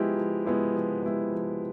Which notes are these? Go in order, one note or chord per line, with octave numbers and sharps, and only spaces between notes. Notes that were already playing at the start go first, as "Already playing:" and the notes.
Already playing: F3 G#3 B3 E4 G4
F3
G#3 B3 E4 G4
F3
G#3 B3 E4 G4
F3